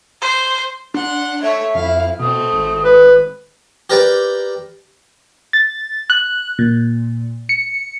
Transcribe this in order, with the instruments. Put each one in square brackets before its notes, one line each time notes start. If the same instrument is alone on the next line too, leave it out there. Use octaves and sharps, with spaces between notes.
[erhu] C5
[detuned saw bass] D4 [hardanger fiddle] F#5 C6
[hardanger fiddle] A3 C#5 [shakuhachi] E5
[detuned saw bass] F2 [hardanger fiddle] E4 F5
[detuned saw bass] B2 [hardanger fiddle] A3 C4 [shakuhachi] D#6
[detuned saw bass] G#1
[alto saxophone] B4
[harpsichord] G4 A#4 B4 D5 G5
[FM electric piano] A6
F#6
A#2
C#7